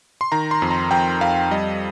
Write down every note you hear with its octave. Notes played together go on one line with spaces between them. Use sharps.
C6
D#3 A#5
C6
F2
A#5
F2 G5
F2 F5
G3 D#5